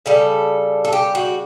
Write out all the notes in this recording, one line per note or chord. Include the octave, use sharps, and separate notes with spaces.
C#3 G3 A4
A4
G4
F#4